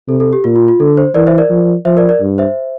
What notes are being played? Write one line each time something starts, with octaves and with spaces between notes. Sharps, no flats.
C3 A4
A4
G4
A#2 F4
F4
F4
D3 A4
C5
E3 A#4 D5
C5 E5
A#4 D5
F3
F3 C5 E5
A#4 D5
A#4 D5
G2
C5 E5